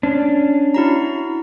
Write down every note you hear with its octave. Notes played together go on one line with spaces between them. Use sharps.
C#4 D4
E4 F#4 A#5